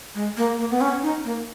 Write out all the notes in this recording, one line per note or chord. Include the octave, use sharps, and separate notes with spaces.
G#3
A#3
A#3
B3
C#4
D#4
A#3